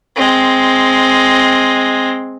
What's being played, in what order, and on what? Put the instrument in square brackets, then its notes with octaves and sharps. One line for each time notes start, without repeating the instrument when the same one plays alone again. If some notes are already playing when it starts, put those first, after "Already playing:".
[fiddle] G#3 C4